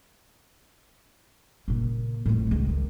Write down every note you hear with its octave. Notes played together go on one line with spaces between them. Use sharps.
A#2 C#3
F2 A2
C#2 C#3
D#3